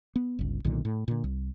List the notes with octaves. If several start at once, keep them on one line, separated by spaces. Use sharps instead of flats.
B3
G1 C#2
B1 A#2 D3 D#3
A2
A#2 D3
C2